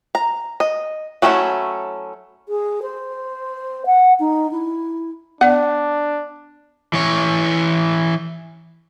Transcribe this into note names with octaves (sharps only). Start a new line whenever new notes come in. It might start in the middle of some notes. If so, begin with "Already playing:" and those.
A#5
D#5
F#3 A3 C#4 D#4 E4
G#4
C5
F#5
D#4
E4
B3 D4 D5 F#5
E3 C#5